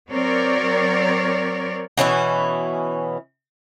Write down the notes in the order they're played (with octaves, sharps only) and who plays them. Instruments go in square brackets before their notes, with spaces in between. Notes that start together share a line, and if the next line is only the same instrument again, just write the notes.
[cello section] F#3 C4 A#4 C#5 D5
[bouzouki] B2 E3 C#4 E4